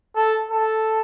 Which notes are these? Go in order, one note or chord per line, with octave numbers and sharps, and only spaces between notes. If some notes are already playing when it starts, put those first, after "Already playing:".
A4
A4